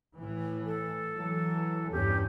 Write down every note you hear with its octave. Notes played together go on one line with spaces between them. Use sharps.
A2 E3
A4
E3 F#3
E2 G2 C#4 G4